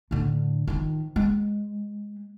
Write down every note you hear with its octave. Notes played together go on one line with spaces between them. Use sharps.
A2 D3
D#3 F3
G#3